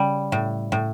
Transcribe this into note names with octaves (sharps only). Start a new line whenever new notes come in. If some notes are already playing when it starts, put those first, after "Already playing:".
Already playing: C#3 G3
A2
A2